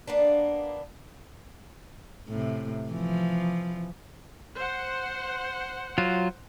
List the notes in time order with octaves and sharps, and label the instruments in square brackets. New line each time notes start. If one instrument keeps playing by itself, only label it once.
[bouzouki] A#3 B3 D4
[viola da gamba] A2 C3
E3 F3
[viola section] C5 F#5
[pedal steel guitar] F#3 F4